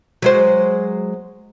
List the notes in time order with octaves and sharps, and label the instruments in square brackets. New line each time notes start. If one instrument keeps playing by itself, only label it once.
[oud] F#3 G#3 C5